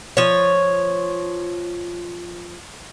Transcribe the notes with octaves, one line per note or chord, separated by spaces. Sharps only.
F3 C#5